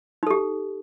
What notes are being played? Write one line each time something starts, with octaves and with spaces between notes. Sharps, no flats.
D#4 G4 A4